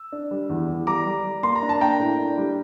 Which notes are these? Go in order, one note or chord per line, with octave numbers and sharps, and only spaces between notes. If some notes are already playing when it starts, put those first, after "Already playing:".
Already playing: E6
D4
G3
E2
E2
G3 A#5 D6
G3
G3
A#3 C6
A#5
D4
A5
A#3 G5 A#5
A2
D4
G3